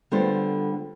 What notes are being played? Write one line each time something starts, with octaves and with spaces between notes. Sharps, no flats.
D3 G3 B3 F4 C5